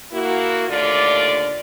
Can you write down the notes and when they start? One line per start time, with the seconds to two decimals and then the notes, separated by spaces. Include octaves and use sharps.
0.12 A#3 E4 F#4
0.69 D#2 D3 A3 F4 D5